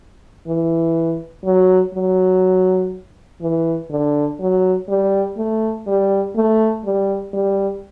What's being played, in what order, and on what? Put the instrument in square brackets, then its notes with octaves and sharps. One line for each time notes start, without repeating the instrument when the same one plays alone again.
[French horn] E3
F#3
F#3
E3
D3
F#3
G3
A3
G3
A3
G3
G3